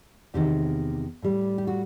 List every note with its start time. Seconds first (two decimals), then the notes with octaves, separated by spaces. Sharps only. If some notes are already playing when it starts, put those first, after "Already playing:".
0.34 E2 C3 D#3 G4
1.22 A2 G3
1.58 G4
1.67 F#4